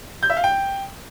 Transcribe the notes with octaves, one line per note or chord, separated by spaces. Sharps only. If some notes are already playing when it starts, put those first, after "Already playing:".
G6
E5
F5
G5